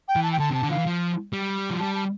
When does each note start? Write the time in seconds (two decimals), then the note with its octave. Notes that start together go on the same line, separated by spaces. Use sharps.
0.08 G5
0.16 E3
0.23 A5
0.32 G5
0.39 D3 A5
0.50 C3 A5
0.63 D3
0.69 E3 F3 F5
0.86 F3
1.33 G3
1.70 F3
1.80 G3 A5
1.95 A5